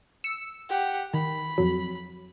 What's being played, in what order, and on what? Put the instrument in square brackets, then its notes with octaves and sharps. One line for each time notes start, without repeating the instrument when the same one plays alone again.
[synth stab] E6 C#7
[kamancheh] G4 F#5
[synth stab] D#3 [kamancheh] B5
[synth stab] F2 F#3